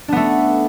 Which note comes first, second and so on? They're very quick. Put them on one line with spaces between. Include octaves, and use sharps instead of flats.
D4 B3 A3